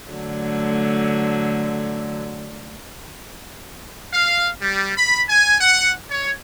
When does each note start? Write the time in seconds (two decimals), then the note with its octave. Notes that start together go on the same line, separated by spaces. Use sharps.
0.10 D3 F#3 A3
4.12 F5
4.60 G3
4.96 B5
5.28 G#5
5.60 F#5
6.10 C#5